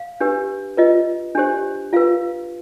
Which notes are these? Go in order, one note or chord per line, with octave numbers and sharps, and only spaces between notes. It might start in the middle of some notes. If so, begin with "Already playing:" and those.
Already playing: F5
D4 G4 B4
F4 B4 D#5
D4 G4 C5
F4 B4 F5